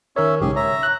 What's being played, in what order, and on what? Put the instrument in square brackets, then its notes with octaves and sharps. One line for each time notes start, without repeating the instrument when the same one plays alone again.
[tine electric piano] D#3 A#4 C#5 [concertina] C#4 E5
[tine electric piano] B1 G#2 C#3 [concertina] G4 G#4
[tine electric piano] C#5 [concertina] E5 A#5
[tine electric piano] F#6